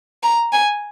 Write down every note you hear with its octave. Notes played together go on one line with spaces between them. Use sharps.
A#5
G#5